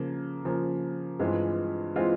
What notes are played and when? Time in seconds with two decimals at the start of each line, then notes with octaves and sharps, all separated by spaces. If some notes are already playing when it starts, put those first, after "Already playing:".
Already playing: C#3 F3 A#3
0.45 C#3 F3 A#3
1.19 G2 E3 G#3 C4 F4
1.96 E3 G#3 C4 F4